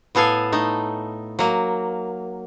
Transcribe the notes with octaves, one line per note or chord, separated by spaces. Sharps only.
A2 B3 A4 F5 G#5
A3 D#4
F#3 A#3